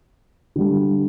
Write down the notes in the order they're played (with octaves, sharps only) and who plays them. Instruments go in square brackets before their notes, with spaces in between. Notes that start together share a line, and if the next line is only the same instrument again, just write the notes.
[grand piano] D3 G3